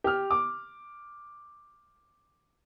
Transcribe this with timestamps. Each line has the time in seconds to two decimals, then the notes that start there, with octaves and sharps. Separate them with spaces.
0.04 G4 F6
0.31 D6